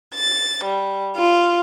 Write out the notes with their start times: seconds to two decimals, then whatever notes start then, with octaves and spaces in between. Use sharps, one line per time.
0.14 A6
0.64 G3
1.17 F4